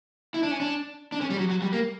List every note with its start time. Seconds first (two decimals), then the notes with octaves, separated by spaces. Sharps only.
0.34 E4
0.43 D4
0.51 C#4
0.60 D4
1.12 D4
1.21 C#4
1.30 G3
1.38 F#3
1.50 F#3
1.62 G3
1.73 A#3